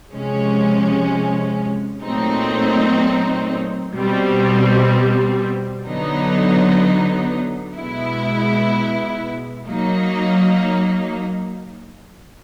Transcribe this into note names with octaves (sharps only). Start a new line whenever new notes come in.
C3 F3 G#3 C#4
A#2 F#3 A3 C4 D#4
B2 G3 C4
D3 F#3 B3 D#4
B2 G#3 B3 E4
F#3 A#3 D#4